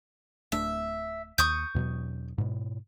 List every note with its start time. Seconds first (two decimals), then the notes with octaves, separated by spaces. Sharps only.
0.52 D1 A3 D4 E5
1.38 D#2 C#6 D#6 G6
1.75 E2 B2 F#3
2.38 G#2 B2